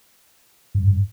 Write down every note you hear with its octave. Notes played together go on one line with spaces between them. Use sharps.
G2
G2